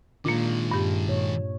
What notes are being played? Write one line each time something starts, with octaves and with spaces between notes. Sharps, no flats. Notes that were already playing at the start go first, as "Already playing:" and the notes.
A#2 D#3 G#3 A#3 D4 F4
G2 G4
A#2 C#5